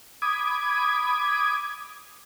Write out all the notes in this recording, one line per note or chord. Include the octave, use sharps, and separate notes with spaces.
B5 D6 D#6 G#6